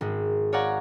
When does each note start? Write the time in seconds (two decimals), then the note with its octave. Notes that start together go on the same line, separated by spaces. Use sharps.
0.01 G#1 G#3
0.52 C#5 D5 F5 F#5 G#5 A#5